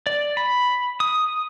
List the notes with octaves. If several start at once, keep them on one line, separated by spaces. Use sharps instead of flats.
D5
B5
D#6